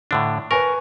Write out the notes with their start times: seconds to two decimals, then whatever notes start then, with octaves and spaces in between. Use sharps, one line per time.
0.11 A2 D3 D4
0.51 A#4 B4 G#5 C#6